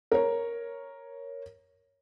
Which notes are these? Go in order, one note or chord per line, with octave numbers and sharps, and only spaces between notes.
A#4 C#5